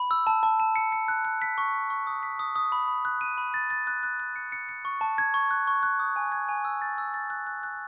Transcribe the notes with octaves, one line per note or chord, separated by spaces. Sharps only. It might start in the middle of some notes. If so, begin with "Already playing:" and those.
Already playing: B5
E6
A5
A5
A5
C#7
C#7
F#6
F#6
B6
C#6
B6
C#6
D#6
B6
D#6
D#6
B5
B5
F#6
D#7
B5
A6
A6
F#6
F#6
F#6
C#7
C#7
C#7
C#6
A5
G#6
C#6
F#6
C#6
F#6
D#6
G#5
G#6
G#5
E6
A6
E6
A6
F#6
F#6
F#6